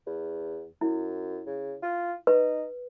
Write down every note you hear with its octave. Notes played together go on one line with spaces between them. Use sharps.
E2
F#2 E4
C#3
F4
D#4 B4